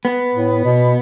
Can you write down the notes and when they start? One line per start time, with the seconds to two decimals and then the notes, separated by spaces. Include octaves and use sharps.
0.05 B3
0.35 A2
0.64 B2